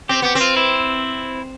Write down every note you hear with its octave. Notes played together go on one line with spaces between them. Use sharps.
C4 G4
B3 G4
C4
F4
E4